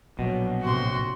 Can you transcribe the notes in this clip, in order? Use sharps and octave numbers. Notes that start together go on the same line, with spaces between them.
A#1 B2 F#3
A2 C3 F#4 C6